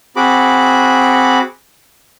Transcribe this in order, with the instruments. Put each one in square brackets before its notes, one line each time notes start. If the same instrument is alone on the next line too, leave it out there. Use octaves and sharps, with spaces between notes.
[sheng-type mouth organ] C4 F#4 G#4 B5 D6